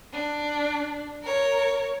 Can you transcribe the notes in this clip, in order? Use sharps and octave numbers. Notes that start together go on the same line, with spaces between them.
D4
A#4 C#5